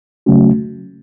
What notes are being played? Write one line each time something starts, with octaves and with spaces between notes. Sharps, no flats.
C#3 F#3 A3 C#4 F#4